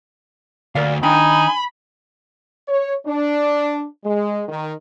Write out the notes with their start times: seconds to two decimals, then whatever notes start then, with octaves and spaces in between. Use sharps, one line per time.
0.75 D2 A#4 D5 F5
1.03 D#3 D4 D#4 G5 G#5 B5
2.68 C#5
3.06 D4
4.04 G#3
4.48 D#3